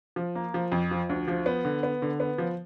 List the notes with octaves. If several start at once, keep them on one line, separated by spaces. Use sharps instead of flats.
F3
A#3
F3
F2
F3
D2
F3
B3
D3
B3
D3
B3
F3